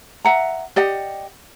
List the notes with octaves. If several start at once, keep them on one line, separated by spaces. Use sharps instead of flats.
E5 F#5 A#5
G4 D5 D#5 F#5